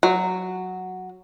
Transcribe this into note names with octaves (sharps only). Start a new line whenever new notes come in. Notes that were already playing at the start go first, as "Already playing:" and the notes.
F#3